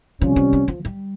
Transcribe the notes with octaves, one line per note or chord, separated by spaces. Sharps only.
C3 F3 G3 C#4
F3
F3
F3
G3